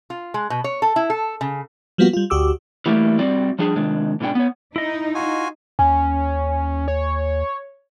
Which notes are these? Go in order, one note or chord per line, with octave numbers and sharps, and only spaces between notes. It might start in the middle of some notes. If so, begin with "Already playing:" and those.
F4
G#3
B2
C#5
A4
E4
A4
C#3
F3 G3 A#3 B3 F4 F#4
G3 F4
D2 F#4 G4 D6 E6
E3 G3 A3 A#3
G2 G3 C4 F#4 D5
F3 G3 D4 G#4
C3 D#3 G#3 D4
G#2 B2 C#4 D4 G5
B3 C#5
D#4 E4 D#5
F4 F#4 G#5
D#2 C#4 G#5
C#5